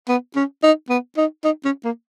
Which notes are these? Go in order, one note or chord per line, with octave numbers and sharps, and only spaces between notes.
B3
C#4
D#4
B3
D#4
D#4
C#4
A#3